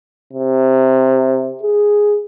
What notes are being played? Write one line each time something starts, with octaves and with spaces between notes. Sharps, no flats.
C3
G#4